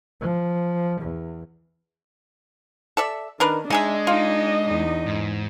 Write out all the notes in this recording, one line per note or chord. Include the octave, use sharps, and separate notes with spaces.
F3
E2
A4 D5 E5
D#3 D4 A#4 B4
G#3 D4 D#4 G#4 D#5 E5
D#4 F4
E2 D#4
G#2